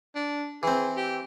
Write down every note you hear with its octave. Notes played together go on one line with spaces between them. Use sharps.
D4
E3 C4 G#4
G4